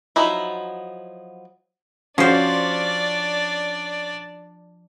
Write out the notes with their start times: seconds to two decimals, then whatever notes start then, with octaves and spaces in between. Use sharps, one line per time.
0.16 F3 F#3 D#4 E4
2.18 F3 C#4 D4 F#4 C5 D5